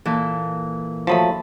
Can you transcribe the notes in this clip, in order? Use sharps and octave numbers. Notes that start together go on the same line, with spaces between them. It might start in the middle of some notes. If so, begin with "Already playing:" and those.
A#2 E3 A4
F3 F#3 A3 A5 B5 D#6